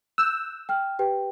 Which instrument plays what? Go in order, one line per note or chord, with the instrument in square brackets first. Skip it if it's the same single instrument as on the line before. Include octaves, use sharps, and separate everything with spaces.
[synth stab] E6 [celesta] F#6 G6
[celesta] G5 F6
G4 B4 G5